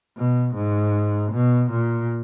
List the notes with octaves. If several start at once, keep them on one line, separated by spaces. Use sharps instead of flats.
B2
G#2
B2
A#2